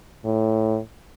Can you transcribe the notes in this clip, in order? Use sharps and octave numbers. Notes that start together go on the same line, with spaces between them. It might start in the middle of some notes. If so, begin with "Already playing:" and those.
A2